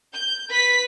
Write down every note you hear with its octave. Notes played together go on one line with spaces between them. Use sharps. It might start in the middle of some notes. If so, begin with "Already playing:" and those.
G6
B4 B6